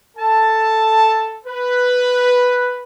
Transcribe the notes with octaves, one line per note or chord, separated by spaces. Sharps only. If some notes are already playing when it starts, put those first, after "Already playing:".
A4 A5
B4